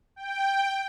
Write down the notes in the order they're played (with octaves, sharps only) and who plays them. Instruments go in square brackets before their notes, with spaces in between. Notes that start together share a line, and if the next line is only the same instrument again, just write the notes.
[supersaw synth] G5